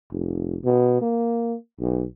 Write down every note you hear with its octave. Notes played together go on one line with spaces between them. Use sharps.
F1
B2
A#3
B1